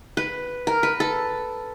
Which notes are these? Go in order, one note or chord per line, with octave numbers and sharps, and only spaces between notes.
B4
A#4
B4
A4